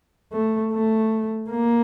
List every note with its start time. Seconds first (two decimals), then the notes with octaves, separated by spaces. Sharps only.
0.32 A3
0.72 A3
1.50 A#3